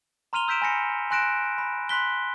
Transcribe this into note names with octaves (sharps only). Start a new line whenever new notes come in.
A#5 C6 F6 D#7 F7 G7
E6 G6 B6 D7 E7
G#5 B5 A#6 C#7
G#5 C6 F#6 A#6 D7 E7
B5
B5 C6 F#6 B6 G7